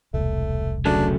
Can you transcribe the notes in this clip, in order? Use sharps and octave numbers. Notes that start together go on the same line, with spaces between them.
E1 C2 A3
C#3 F#3 A3 D4